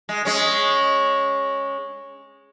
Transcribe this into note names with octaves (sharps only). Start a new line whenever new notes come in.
G#3
G#3 C#4